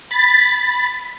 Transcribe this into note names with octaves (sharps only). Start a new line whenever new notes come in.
B5 A6